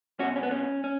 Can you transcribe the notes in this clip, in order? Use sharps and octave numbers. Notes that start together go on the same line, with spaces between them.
B1 B2 C#4 F#4
C#4
B3
C#4
C#4